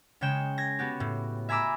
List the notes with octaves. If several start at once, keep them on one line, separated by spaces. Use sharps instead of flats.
C#3 G#3 C#5 G5 E7
G#6 A#6
B3 F#4 G4
A2
E5 G#5 A#5 B5 D6 E6